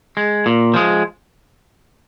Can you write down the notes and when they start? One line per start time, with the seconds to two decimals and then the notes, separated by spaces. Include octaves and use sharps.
0.17 G#3
0.46 A#2
0.74 F3 G#3